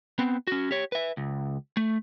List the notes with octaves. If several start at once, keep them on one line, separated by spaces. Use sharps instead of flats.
B3 C4
C#4 F#4
G4 C#5
B4 E5
C#2
A3